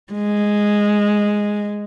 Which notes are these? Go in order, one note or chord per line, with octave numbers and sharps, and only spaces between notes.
G#3